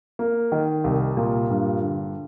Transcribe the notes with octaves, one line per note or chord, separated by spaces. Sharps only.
A#3
D#3
C2
A#2
G2
D3